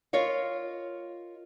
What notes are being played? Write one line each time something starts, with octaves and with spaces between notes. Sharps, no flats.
F4 A#4 C#5 D#5 F5